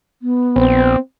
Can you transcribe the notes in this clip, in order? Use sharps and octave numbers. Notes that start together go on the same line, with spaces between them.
B3
A#1 C4